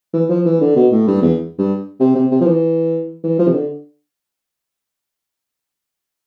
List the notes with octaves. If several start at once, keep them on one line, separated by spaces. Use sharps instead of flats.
E3
F3
E3
D3
B2
A2
G2
E2
G2
C3
C3
C3
F3
E3
E3
F3
C3
D3